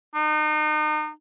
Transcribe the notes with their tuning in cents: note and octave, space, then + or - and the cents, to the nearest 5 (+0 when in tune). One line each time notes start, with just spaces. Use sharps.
D#4 -35